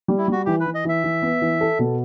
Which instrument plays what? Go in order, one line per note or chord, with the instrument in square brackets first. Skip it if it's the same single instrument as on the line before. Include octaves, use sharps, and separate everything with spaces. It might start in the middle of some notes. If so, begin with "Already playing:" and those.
[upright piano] G3
[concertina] E4
[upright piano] G3 [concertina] F#4
[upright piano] E3 [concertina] G4
[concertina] B4
[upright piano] E3
[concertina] D#5
[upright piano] E3 [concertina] E5
[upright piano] E3
B3
E3
A4
B2